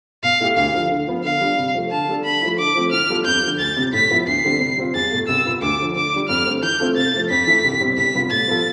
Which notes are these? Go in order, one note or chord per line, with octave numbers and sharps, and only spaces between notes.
B2 F5
A3 E4 G4
D2 F5
D3 F3
D3
F3 B3
D3 F5
G3 D4
C3
F3 A3
D3 A5
G3 D4 A4
D3 B5
F3 A3 E4
D3 D6
F3 A3 C4
E3 F6
G3 B3 F4 A4
F2 G6
D3 F3
D2 A6
C3 G3
A2 B6
F3 B3 E4
D2 C7
D3 G3 C4
C3
G3 C4 F4
E2 A6
B2 A3
C2 E6
B2 B3 F4
D2 D6
D3 F3
D3 D6
G3 D4
F2 F6
D3 A3 C4
E3 G6
A3 C4 F4 A4
C3 A6
F3 A3
F2 B6
E3 A3 E4 A4
C2
B2 G3 C4
C2 B6
C3 G3 B3 F4
A2 A6
F3 B3 F4 A4